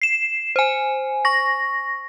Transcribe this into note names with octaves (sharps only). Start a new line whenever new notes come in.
C7 E7
C5 G#5
C#6 A#6